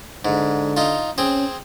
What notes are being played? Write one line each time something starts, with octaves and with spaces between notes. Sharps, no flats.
G#2 D3
D#4 F4
C4 C#4 G#4